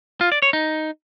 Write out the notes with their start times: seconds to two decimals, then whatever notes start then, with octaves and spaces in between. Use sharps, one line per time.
0.21 F4
0.32 D5
0.42 C#5
0.53 D#4